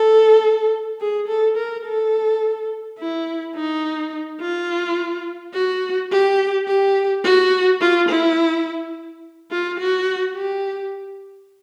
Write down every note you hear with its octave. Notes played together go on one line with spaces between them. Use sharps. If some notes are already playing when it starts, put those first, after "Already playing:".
Already playing: A4
G#4
A4
A#4
A4
E4
D#4
F4
F#4
G4
G4
F#4
F4
E4
F4
F#4
G4